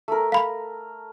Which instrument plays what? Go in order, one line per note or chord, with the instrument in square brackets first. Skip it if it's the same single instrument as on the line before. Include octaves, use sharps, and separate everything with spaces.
[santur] A3 A#4
[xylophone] F5 B5